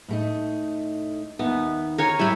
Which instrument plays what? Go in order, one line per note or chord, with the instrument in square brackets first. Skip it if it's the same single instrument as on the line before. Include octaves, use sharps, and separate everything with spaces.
[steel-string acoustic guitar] A2 A3 D#4
[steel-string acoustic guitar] D#2 D#4 E5 [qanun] B3
[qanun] A#4 C#5 G#5
[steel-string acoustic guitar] G#2 G3 E5 [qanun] E4 G5 B5